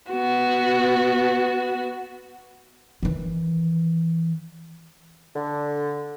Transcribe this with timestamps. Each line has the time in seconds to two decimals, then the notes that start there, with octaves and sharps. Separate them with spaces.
0.10 B3 F#4
3.03 D#3 E3
5.36 D3